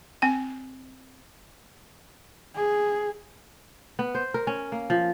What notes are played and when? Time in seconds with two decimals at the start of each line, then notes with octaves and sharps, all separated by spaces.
0.22 C4 G5
2.55 G#4
3.99 B3
4.15 C5
4.34 A#4
4.47 C#4
4.72 A#3
4.90 F3